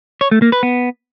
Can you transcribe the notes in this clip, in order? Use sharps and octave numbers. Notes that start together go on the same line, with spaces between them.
C#5
A3
A#3
B4
B3